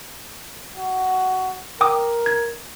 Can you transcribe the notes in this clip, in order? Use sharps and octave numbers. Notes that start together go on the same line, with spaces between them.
F#4
A#4 G5 D6 D#6
G#6